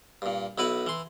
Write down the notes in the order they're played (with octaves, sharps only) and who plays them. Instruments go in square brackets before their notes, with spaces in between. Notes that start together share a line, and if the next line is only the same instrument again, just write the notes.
[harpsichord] G2 A#2
B1 E4 F#4 B4
E3 C6